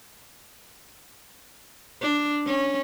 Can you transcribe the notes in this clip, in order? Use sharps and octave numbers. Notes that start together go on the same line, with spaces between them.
D4
C#4